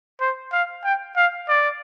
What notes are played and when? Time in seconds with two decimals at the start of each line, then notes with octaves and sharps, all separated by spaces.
0.21 C5
0.53 F5
0.84 G5
1.16 F5
1.49 D5